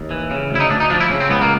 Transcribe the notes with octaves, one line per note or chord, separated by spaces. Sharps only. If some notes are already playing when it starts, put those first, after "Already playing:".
Already playing: D#2
E3
C#3
D2 E4
D#4
D2 D4
D#4
F3 D4
E4
C#3
C4
C#2 B3
A#3